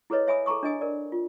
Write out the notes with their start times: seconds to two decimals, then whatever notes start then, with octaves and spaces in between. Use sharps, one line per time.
0.10 E4 G#4 A4 B4 C#5 D#5
0.27 C#5 E5 G#5 B5 D#6
0.46 G#4 A4 A5 A#5 C#6 D#6
0.63 D4 D#5 G#5 D#6
0.81 A#4 D5
1.12 F4